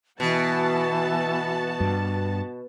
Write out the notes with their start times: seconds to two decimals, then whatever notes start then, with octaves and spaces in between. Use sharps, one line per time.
0.20 B2 E3 B3 F#4 A5
1.80 G2